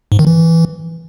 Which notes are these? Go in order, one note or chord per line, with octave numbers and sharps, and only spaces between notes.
G#2
D#3
E3